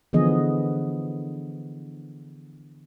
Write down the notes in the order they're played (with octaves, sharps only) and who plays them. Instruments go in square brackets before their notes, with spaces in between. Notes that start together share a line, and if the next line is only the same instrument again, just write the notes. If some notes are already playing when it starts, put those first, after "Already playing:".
[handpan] D3 E3 F3 B3 G#4 D#5